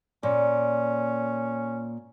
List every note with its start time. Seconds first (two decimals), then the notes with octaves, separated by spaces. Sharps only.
0.23 A#2 C#4